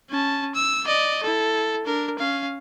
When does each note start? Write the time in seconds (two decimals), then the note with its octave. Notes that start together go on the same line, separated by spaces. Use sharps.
0.10 C#4 A5
0.55 E6
0.86 D5 D#5
1.23 E4 A4
1.85 D4 A#4
2.19 C#4 F5